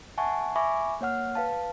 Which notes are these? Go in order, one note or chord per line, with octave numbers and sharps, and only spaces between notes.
E5 F#5 G#5 A5 C#6
E5 G#5 B5 C#6 D6
A#3 C#5 F#5 F6
B4 F5 A5